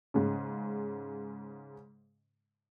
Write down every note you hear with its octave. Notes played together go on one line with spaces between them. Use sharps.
G#2 C#3